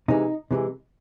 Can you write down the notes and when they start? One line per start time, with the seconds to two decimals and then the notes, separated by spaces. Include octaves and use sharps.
0.08 C3 E3 G#3 D#4
0.51 C3 E3 G#3